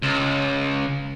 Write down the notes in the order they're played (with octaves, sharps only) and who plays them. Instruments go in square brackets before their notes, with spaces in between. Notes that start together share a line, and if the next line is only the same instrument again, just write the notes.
[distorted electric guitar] C#2